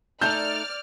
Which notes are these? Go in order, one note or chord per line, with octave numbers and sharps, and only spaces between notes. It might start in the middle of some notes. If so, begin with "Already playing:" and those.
A3 D#4 D5 A5 F6 G6